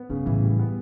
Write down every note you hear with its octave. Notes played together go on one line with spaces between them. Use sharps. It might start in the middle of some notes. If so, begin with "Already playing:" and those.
Already playing: B3
G#2 C#3
A2 E3
G3
B3